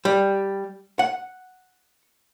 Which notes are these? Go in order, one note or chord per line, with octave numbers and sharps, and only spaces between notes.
G3
F#5